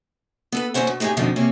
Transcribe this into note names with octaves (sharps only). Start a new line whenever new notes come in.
B3 A4 B4
D#2 F3 C#4 C5 F#5
B2
A2 C3 D#4 G4 G#4
F2 B2 D3 F3 D#4
C3 A#3 C#4